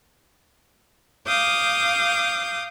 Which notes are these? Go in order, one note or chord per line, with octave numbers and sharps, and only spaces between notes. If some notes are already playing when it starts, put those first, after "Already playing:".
F5 D6 D#6 G6